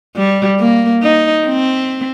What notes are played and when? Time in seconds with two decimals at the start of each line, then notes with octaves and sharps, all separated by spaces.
0.16 G3
0.60 A#3
1.03 D#4
1.46 C4